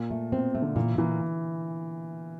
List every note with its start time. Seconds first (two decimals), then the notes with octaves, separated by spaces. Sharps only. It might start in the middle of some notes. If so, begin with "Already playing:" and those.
Already playing: A#2
0.11 A3
0.32 B2 C4
0.55 A3
0.62 D3
0.76 A#2 E3
0.98 A#2 E3